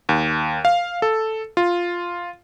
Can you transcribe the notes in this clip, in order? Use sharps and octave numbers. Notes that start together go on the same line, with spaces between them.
D#2
F5
A4
F4